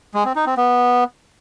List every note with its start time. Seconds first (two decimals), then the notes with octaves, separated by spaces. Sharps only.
0.14 G#3
0.25 C4
0.36 D#4
0.46 C4
0.57 B3